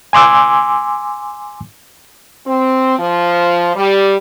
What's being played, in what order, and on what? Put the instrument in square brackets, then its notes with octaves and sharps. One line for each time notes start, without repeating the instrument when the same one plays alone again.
[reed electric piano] G#5 C6 D6 E6
[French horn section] C4
F3
G3